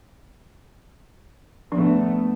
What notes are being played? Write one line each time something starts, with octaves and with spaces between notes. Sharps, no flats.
F3 A3 B3 D4